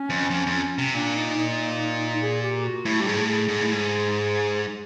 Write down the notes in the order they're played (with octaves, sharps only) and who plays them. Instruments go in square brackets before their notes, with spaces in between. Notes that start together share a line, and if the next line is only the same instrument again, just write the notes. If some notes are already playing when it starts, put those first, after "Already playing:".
Already playing: [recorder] C#4
[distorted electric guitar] F2
F2
F2
C3
[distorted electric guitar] A#2 [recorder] D4
[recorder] D#4
D#4
G#4
G4
F#4
[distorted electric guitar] A2 [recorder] E4
[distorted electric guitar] G2 [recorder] G4
[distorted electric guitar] G#2 [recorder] G#4
[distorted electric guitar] A2
[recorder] G#4
[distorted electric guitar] G#2
A2
G#2